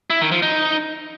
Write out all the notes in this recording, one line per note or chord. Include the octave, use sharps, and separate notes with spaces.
E4
D#3
F3
D#4